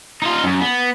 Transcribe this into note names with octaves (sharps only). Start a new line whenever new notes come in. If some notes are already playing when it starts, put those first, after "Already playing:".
D#4 F4
F#2
B3